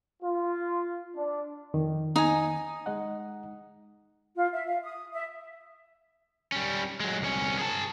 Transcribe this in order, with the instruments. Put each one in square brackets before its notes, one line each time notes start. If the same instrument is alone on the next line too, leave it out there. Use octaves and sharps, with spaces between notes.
[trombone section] F4
D4
[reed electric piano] F2 D#3
[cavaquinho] D#4 G#5
[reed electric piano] G#3 D#5 F#5
[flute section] F4
E5
F5
D#6
E5
[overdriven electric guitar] G3 C#4
F#3 G#3
C2 C#4
G#4 A5